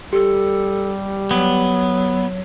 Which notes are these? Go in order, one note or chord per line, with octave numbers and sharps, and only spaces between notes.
G3 G4 A4
F#3 B3